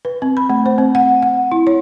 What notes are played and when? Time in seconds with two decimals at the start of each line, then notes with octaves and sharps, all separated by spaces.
0.05 B4
0.22 C4
0.37 B5
0.50 A3
0.66 C5
0.78 C4
0.95 F#5
1.23 F#5
1.52 E4
1.67 C#5